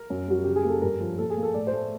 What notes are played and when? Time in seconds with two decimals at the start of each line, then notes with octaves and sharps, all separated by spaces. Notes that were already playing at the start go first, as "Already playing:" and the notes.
Already playing: A#4
0.10 F#2
0.28 G3 F#4
0.44 C#3 G4
0.56 G#4
0.64 A#3 A4
0.82 G2 A#4
1.00 F3
1.18 A#2 A4
1.30 G#4
1.37 A#3
1.43 A4
1.54 A2 D5
1.67 C5
1.73 A3